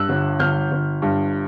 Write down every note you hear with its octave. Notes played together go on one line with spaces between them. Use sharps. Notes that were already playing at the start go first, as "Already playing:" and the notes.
Already playing: G2 E6 F#6
G1
G1 F6 G6
G1
G2